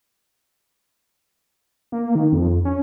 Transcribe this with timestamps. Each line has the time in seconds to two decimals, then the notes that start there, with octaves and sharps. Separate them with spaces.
1.92 A#3
2.15 D#3
2.33 F2
2.65 C#4